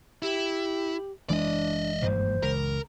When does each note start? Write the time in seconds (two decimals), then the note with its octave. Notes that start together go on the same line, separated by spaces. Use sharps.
0.22 E4 G4
1.29 F#1 E3 G#3 D4 D5 D#5
2.02 A#1 G2 A#3 C5
2.43 C#2 A#4